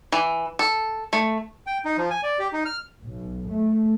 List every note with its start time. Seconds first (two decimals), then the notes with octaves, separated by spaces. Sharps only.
0.12 E3
0.59 A4
1.13 A3
1.67 G5
1.85 D#4
1.98 F3
2.10 G#5
2.23 D5
2.39 G4
2.53 D#4
2.65 F6
3.03 B1
3.50 A3